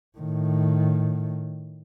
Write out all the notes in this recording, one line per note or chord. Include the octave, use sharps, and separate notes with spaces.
A2 D#3